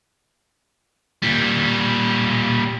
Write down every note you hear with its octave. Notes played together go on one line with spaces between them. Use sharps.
A#2 G3